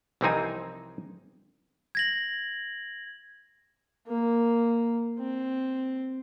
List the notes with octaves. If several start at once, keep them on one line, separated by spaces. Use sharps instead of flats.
C2 E3 F3 C4 D#4 G#5
G#6 A#6 F#7
A#3
C4